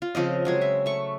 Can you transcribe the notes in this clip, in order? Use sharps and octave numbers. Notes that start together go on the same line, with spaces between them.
F4
C#3 F3 C4 D#5
F#3 G#3 G#4
E5
A3 C#6